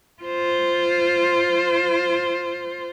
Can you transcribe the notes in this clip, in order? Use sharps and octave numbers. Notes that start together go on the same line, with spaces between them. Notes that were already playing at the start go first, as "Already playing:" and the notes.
F4 C5